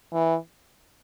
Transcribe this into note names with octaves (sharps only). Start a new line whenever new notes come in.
E3